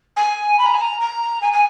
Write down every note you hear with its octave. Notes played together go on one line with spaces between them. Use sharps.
G#5
B5
A#5
G#5
A#5
A#5
G#5
G#5